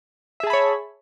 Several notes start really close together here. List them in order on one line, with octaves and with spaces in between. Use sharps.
E5 G#4 A5 B5 C#5